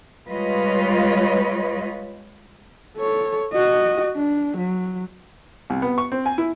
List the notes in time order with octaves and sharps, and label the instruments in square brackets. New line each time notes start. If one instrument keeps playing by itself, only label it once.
[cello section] G3 G#3 F4 B4 C#5 D#5
[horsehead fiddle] A4 C#5
F#4 D#5
D4
F#3
[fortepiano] C2
B3
C#6
C4
G#5
E4